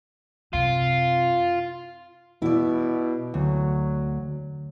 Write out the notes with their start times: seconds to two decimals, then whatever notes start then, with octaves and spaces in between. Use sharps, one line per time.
0.53 F#2 C3 F4
2.42 B2 E4 D5
3.34 D2 F#3